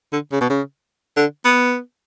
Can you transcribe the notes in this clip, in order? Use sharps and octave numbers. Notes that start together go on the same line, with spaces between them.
D3
C#3
B2
C#3
D3
B3